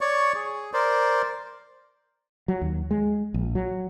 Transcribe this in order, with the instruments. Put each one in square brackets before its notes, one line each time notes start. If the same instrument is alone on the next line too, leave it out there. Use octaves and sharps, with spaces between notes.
[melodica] C#5 D5 C#6
G#4
A#4 C5 D5
[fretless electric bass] F#3
D#2
G#3
A#1
F#3